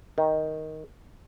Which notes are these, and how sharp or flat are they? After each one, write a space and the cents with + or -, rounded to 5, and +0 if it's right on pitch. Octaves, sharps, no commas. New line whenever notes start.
D#3 +5